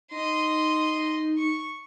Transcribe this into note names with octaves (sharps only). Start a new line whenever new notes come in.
D#4 D#5 C6
C#6